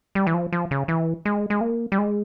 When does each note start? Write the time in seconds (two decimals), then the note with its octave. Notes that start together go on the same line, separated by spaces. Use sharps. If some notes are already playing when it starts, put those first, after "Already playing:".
0.15 G3
0.27 E3
0.34 F3
0.53 F3
0.71 C#3
0.88 E3
1.25 G#3
1.50 G#3
1.61 A#3
1.92 G3
1.98 G#3